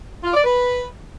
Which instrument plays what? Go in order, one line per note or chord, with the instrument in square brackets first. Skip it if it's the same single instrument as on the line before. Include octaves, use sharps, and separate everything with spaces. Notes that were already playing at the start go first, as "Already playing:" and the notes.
[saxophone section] F4
D5
B4